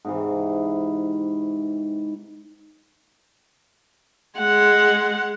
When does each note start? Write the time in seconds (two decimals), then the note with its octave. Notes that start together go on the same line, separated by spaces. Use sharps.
0.05 G#2 C3 E3
4.38 G#3 F#5